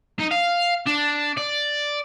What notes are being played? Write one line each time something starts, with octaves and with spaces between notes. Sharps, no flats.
D#4
F5
D4
D5